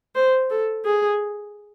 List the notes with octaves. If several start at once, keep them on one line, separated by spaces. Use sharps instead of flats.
C5
A4
G#4